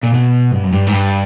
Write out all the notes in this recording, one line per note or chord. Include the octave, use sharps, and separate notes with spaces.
A#2
B2
G2
F#2
G2
G#2
G2